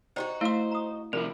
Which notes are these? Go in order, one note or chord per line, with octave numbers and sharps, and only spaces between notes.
D#4 F4 F#4 C5 D5 G5
A3 E4 C5 F5 C6 E6
A#5 D#6
C3 F3 E4 A#4 D5